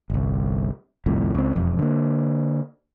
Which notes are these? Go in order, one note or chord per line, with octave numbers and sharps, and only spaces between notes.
G1 C2
G1 C2 F2 A2
C#2 C4
E1 F2
D3 A#3